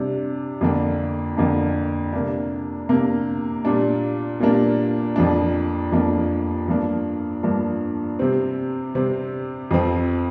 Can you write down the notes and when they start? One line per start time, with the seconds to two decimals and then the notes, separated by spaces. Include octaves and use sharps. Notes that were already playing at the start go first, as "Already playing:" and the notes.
Already playing: C3 G3 D4
0.61 F2 D3 A#3 D4
1.37 F2 D3 A#3 D4
2.13 C3 A#3 D4
2.89 C3 A#3 D4
3.65 A#2 G3 A#3 D4
4.40 A#2 G3 A#3 D4
5.16 F2 F3 A#3 D4
5.92 F2 F3 A#3 D4
6.68 G2 F3 A#3 D4
7.43 G2 F3 A#3 D4
8.19 C3 G3 C4
8.95 C3 G3 C4
9.71 F2 F3 C4